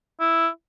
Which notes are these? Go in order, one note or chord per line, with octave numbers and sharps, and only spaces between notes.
E4